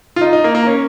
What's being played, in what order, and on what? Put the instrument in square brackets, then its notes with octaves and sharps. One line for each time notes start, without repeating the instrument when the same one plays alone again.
[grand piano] F4
D#4
D#4
A#3
A#3
C#4